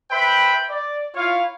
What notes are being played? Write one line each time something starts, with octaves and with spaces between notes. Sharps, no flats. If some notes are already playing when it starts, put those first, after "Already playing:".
B4 C5 E5 G5 B5
D5
E4 F4 C#5 F5